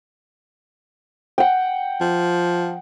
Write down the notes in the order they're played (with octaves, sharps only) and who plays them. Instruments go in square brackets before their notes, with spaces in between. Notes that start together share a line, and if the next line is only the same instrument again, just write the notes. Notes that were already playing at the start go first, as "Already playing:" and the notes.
[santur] F#5 G5
[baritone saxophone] F3